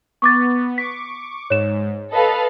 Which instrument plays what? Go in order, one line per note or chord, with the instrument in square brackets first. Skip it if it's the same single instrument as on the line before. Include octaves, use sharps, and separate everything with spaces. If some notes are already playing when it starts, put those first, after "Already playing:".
[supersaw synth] B3 [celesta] C#6 D6 A6
[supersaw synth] C#6 D6 [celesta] B6
[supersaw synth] G#2 [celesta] C#5 E7
[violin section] A4 B4 F5 [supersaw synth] D#5